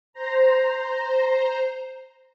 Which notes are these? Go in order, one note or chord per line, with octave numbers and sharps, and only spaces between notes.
C5 A#5